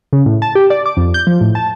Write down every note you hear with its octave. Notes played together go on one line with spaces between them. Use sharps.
C#3
A2
A5
G4
D5
D6
F2
G6
F3
A2
A5